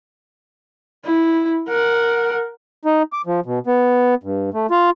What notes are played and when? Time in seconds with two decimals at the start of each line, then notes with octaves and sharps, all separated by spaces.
1.05 E4
1.68 A#4 F#5
2.85 D#4
3.13 D6
3.26 F3
3.46 B2
3.67 B3
4.24 G2
4.54 A3
4.71 F4